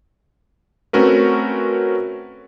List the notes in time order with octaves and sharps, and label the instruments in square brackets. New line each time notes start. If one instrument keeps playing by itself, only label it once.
[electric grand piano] A3 C4 C#4 F#4 A#4 B4